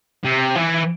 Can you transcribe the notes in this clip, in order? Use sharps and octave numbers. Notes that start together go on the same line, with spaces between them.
C3
E3